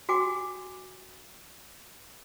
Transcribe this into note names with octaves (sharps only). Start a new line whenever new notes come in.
F#4 F#5 G#5 D6